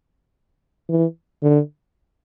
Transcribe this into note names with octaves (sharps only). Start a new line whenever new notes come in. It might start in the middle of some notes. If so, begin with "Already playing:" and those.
E3
D3